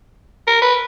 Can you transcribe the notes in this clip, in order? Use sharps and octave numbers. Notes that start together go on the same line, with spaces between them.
A#4
B4